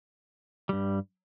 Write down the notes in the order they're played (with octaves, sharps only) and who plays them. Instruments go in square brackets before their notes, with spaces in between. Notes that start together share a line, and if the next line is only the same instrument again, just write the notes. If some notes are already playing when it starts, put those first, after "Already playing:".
[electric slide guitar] G2 G3